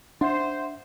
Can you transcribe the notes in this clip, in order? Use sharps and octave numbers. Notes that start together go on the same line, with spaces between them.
D4 C5 E5 F#5 C6